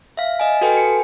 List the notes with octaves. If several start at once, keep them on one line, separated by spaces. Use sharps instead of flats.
E5 F5
D#5 G#5
F#4 A4 B4 G5 G#5
C#7